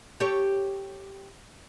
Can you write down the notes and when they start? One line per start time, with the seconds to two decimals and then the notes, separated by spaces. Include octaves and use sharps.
0.20 G4 A4 C#5